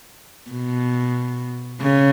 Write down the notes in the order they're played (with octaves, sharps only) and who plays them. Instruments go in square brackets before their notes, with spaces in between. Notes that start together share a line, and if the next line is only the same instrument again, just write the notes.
[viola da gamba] B2
C#3